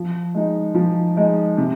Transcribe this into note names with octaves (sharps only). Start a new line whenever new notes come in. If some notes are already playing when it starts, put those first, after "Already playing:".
Already playing: F3
G#3 D#4
F3
G#3 D#4
C3